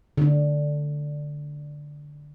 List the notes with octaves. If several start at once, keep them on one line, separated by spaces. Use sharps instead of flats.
D3 D4